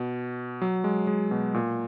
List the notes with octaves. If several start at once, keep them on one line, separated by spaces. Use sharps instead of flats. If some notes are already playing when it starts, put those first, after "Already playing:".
Already playing: B2
F#3
G#3
G#3
B2
A#2